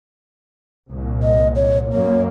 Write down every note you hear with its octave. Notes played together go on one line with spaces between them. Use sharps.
C2 A#2
D#5
C#5
F#2 A#3 C#5